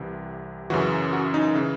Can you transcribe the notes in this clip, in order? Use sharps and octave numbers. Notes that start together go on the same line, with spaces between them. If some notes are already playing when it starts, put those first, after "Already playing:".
Already playing: C2 C3 E3
F#2 C#3 E3 F#4
F#4
D#4
C#3 E3